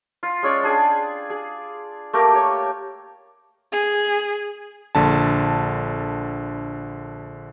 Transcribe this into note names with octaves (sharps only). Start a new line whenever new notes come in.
F4
G#3 C#4 C#5 D5
D4 G#4 G5
G#4
A3 A#3 G4 A#4
G4 C#5
G#4
A#1 D3 A5